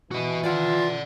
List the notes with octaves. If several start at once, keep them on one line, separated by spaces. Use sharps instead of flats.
E3 F#4 D#5
F4 D5 F#5